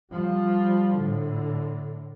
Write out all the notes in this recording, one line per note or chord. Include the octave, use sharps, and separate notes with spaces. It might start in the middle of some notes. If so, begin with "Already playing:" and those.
F3 G3
A2 D3